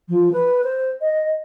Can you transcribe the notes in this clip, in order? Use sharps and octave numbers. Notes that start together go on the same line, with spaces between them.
F3
B4
C5
D#5